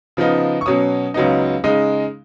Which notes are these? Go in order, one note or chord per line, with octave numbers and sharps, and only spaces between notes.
C#3 F3 B3 D#4
C#6
B2 F#3 C#4 D#6
C#2 C#3 F#3 B3 D#4
C#3 G#3 D#4 D#6